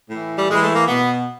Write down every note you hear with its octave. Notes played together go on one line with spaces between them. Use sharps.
A2 E3
G3
A2 E3 G#3
A3
A#3
B2 B3